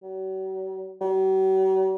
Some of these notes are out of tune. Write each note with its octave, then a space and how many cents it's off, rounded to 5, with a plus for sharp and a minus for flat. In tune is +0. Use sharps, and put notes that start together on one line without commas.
F#3 +45
F#3 +45